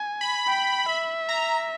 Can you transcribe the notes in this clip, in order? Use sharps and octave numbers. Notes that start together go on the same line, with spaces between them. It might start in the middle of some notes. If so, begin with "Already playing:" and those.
Already playing: G#5
B5
G5
E5
A#5